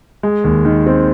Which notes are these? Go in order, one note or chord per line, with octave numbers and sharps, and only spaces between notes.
G#3
D#2
D#3
C4